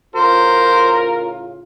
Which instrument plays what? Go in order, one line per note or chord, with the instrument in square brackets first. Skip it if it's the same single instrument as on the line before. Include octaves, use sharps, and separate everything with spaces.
[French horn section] A2 C#3 F4 [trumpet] A#4 [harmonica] C5